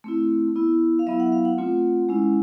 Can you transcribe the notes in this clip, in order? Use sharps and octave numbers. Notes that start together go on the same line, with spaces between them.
A3 C4 E4
B3 E4
F5
F#3 B3 E4 E5
F#5
F5
F#5
A3 C4 F4
G#3 C#4 E4